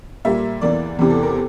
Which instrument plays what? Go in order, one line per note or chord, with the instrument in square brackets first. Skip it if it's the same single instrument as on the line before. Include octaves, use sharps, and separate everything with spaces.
[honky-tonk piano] A#2 G3 A#3 E5
E2 E3 A#3 D5
E2 C3 E3
A4
A#4